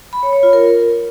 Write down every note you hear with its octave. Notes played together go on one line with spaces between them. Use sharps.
B5
C#5
C#5
F4
A#4